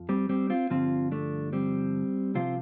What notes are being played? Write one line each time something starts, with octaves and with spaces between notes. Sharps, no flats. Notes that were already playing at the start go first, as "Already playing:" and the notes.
Already playing: F2 F3
G3 C4
G3 C4
C4 F4
G2 D3 F3 C4 F4
A3 D4
G3 C4
C2 C3 F3 C4 F4